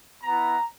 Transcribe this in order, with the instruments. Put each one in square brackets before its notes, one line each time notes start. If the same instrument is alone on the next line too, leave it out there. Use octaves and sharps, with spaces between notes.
[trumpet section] B3 E4 A#5